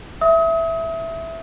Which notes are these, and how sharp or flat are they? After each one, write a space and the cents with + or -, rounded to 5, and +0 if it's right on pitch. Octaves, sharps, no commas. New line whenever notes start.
E5 +0 D#6 +35